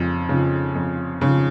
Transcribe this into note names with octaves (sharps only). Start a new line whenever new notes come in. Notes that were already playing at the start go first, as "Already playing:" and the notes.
Already playing: F2 C#3
C#3 F3
F2
C#3 F3